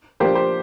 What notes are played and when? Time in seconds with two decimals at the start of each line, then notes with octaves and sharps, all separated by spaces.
0.20 F3 A#3 D4 G4 C5
0.35 G4 C5